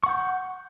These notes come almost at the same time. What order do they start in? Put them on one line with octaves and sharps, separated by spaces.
C#6 F#5 G6